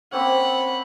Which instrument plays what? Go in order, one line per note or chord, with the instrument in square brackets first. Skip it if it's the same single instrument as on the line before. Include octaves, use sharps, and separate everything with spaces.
[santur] A#3 C4 C#4 [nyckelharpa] F#5 B5